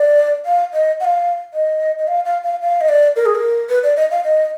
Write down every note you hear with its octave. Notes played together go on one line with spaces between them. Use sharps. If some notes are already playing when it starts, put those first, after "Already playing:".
Already playing: D5
F5
D#5
F#5
F5
D#5
D#5
F5
F5
F5
F5
D#5
D5
A#4
G#4
A#4
B4
D5
D#5
F5
D#5